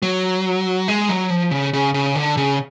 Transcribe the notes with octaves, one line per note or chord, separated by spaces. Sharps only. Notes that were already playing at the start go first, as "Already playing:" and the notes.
F#3
G#3
F#3
F3
C#3
C#3
C#3
D3
C#3